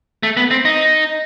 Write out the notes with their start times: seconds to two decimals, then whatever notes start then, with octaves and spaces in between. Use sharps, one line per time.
0.23 A3
0.37 B3
0.51 C4
0.65 D#4